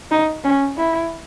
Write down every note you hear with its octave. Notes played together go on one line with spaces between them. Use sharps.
D#4
C#4
E4